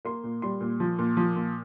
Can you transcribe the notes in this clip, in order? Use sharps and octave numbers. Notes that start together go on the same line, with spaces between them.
A#3 C6
A#2
G3 C6
A#2
F3
A#2
F3
A#2